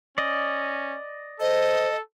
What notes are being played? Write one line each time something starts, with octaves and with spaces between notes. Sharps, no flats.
C#4 D5 D#5
A4 C5 D#5